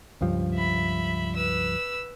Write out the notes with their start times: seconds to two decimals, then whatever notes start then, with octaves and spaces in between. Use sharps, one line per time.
0.21 C#2 G2 F3
0.54 E5 B5
1.36 B4 E6